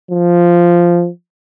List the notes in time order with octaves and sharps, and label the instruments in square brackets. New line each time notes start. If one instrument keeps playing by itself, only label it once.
[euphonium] F3